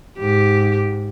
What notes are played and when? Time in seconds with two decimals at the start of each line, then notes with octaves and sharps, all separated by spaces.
0.18 G#2 G4